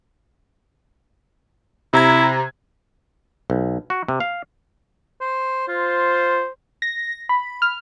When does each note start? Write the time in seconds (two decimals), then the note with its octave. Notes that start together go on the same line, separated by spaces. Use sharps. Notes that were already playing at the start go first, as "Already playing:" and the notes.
1.93 C3 E4 A#5 G#6
3.50 B1
3.90 F#4
4.08 C3
4.20 F5
5.21 C5
5.68 F4 C5
6.82 A#6
7.29 B5
7.62 F6